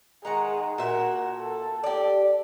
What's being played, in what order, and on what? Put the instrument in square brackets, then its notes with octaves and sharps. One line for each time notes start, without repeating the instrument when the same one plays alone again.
[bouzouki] D#3 F#5 A#5 [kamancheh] G#3
[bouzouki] A#2 E5 [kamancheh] F#4 A#4
[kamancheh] A4
[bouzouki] G4 D5